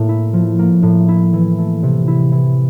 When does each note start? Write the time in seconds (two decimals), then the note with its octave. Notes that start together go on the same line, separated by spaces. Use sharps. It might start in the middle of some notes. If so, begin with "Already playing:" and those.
Already playing: A2 A#3
0.08 E4
0.33 F3
0.59 A#3
0.82 A2
1.08 E4
1.33 E3
1.58 A3
1.83 C3
2.07 E4
2.32 E3